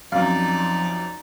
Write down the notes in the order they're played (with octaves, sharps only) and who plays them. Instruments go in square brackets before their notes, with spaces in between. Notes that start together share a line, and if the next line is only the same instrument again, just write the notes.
[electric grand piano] F#2 C4 [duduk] F3 [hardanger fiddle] D#4 D5 [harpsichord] F5